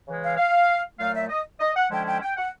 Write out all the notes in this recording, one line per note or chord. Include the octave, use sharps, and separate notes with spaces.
C#3 E3 G#3
F5
F5
A#2 F#3 A3 F5
E5
D#5
D#5
F#5
D3 F3 G#3 C#4 E4 G5
G5
G5
F#5